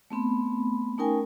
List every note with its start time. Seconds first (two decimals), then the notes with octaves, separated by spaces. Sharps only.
0.10 A3 B3 C4 B5
0.98 A3 C#4 D#4 A#4 G5 G#5